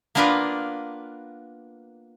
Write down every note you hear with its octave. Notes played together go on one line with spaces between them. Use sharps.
A#3 B3 D4 F4 A#4 B4